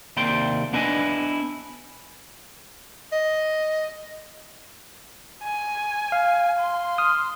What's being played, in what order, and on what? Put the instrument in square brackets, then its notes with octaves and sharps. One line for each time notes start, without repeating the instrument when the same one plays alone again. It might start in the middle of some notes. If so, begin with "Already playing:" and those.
[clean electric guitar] D#2 C3 A#3 D5 G5 C6
B3 D4 E4 B4 D#5 G#5
[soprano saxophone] D#5
[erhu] G#5
[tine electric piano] F5
[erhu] C6
[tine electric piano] D#6 F6